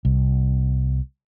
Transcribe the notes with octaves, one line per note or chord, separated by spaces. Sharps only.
C2